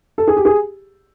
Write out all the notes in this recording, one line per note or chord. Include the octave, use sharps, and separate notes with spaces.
A4
G#4
G4
G#4